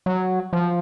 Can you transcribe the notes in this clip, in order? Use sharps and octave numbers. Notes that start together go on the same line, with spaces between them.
F#3
F3